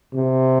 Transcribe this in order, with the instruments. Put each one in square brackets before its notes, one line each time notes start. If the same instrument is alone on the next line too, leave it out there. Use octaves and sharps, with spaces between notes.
[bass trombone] C3